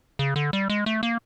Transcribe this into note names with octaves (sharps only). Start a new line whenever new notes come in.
C#3
D3
G3
G#3
A3
A#3